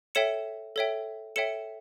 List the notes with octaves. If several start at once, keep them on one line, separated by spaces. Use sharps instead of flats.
A4 C#5 E5 G5 C#7 E7
A4 C#5 E5 G5
A4 C#5 E5 G5 C#7 E7